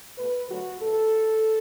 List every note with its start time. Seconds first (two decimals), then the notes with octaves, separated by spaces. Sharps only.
0.17 B2 A3 B4
0.48 D3 F#3 A3 F#4
0.81 A2 A4